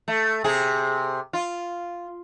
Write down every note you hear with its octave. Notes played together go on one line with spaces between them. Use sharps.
A3
C3 G#4
F4